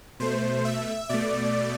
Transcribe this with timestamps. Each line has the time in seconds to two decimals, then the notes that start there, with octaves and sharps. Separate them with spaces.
0.20 B2 A3 C5
0.65 E5
1.09 B2 A3 D5